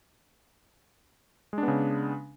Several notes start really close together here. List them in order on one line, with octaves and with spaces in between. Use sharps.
G#3 D4 B3 C#3